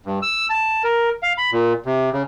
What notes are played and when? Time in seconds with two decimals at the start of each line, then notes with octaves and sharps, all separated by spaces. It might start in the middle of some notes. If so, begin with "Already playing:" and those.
0.06 G2
0.22 E6
0.50 A5
0.84 A#4
1.23 F5
1.38 B5
1.52 A#2
1.86 C3
2.13 C#3